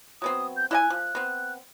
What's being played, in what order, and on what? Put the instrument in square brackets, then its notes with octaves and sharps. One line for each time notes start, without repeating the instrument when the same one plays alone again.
[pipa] F#3 B3 C4 [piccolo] D#6
[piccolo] G6
[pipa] E4 D#5 G#5 [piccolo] F#6
[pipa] F3
B3 C4